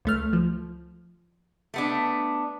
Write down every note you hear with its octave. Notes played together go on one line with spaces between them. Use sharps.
C#2 A3 F6
F3
A3 B3 D4